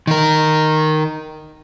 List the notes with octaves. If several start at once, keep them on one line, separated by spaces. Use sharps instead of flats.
D#3 A#4